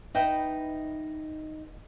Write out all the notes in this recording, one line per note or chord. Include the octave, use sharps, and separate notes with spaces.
D#4 B4 D#5 E5 G5